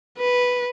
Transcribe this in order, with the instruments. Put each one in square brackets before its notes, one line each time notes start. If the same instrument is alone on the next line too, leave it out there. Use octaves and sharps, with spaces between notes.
[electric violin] B4